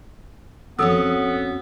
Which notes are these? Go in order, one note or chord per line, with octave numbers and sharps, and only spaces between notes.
F2 B3 C#4 F#4 A4 D#6 E6